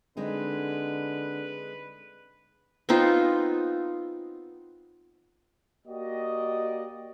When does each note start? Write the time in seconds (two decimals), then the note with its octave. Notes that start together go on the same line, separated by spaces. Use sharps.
0.17 D3 G#3 C4 D#4 B4
2.89 B3 C4 D#4 F4
5.87 A#3 F#4 G4 D5 D#5